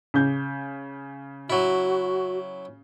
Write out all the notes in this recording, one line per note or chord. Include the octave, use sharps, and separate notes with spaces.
C#3 G6
F#3 E4 F#4